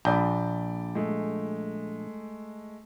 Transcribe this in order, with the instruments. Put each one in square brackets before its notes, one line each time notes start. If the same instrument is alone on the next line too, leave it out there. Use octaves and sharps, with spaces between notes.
[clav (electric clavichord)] A#1 [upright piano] D5 B5 G6
[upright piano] G#3 A3